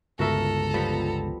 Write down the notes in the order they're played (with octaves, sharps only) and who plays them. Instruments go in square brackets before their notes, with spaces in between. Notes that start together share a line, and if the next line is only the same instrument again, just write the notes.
[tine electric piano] G1 C#2 [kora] F#4 A#4 E5 [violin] A4 A#5
[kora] F3 G3 B3